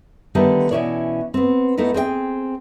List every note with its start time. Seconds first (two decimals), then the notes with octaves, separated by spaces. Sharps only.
0.35 D3 D#3 G3 A3 B3
0.71 B2 E3 C#4 E4 C#5 D5
1.34 B3 C4
1.78 A3 B3 D#4 E4
1.94 C4 G#4 D#5 G5